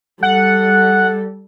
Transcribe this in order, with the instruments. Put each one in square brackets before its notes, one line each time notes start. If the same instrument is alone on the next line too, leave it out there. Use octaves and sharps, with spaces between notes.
[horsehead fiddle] G3 A4 [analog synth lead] F#5